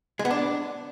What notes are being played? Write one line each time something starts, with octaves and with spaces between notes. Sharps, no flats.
G#3
B3
D4